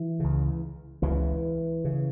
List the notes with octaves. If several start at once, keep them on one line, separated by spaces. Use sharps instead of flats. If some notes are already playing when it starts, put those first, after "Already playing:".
Already playing: E3
C#2 C#3
C#2 C#3 E3
C#3